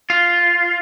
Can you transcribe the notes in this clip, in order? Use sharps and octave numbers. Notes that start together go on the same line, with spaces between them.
F4